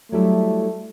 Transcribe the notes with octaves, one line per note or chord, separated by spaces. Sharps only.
F#3 G3 A3 E4